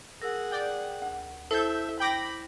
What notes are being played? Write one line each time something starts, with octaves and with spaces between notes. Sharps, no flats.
G#4 A#4 F#5 E6
D5 G5
D2
E4 A4 C5 E5 G6
G5 B5 D6 A#6